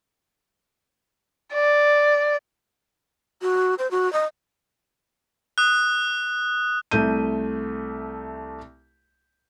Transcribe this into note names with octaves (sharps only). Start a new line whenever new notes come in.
D5
F#4
C5
F#4
D#5
D#6 F#6
C2 A3 G6 D#7